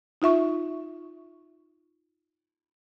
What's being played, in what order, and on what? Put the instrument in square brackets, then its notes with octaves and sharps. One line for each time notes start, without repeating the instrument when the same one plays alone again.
[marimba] D#4 F4 E5 C#6